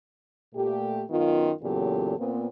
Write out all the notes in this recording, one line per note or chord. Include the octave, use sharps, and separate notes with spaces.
A#2 A3 G4
F#2 D#3 B3 F4
E2 A#2 C#3 F#3 G4 A4
A#2 B3 C4